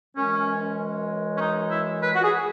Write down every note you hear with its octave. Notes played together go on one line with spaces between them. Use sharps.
F#2 E3 G#3 C#4
C#4
D#4
E4
B4
F#4
G#4